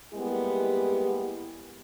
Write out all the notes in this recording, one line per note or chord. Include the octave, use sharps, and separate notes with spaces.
G3 G#3 A#3 B3 E4 G4